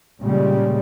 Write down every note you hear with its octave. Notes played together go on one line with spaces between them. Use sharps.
A#2 C#3 G3 G#3